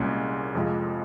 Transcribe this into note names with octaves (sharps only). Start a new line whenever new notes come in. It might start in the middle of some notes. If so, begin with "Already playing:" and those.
Already playing: C2 A#2 G#3 C#4
F2 C3 F3 G#3